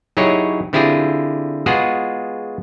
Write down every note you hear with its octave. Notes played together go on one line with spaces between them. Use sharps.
F#3 D#4 E4 G4 G#4 C#5
D3 C4 E4 F4 G4 G#4
G#3 B3 F4 F#4 G#4 F#5